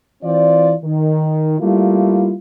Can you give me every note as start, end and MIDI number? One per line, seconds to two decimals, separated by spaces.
0.23 0.73 52
0.23 0.73 60
0.23 0.73 65
0.23 0.73 74
0.84 1.57 51
1.60 2.34 55
1.60 2.34 57
1.60 2.34 58
1.60 2.34 64
1.60 2.34 65